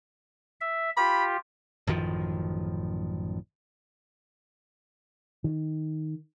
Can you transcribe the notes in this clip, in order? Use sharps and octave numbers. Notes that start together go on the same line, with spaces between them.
E5
F4 G4 B5
A1 F#2 D#3 F3
D#3